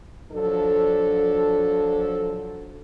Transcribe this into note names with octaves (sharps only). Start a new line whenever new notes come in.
F3 F#3 D4 A4